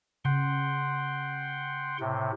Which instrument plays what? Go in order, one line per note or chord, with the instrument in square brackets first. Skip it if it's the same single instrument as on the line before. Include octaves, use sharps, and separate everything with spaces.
[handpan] C#3 [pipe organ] F#5 G5 C6
[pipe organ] A2 C3